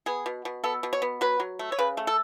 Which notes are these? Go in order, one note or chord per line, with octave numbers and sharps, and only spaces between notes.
B3 G#4
B2
B2
B3 A4
B2
C#5
B3
F#3 B4
F#3
A3
C#5
C#3 B4
A3
A4